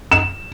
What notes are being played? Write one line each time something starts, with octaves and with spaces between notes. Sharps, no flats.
E7